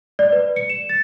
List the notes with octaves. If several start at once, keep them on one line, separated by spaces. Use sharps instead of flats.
D5
B4
C#7
E7
A6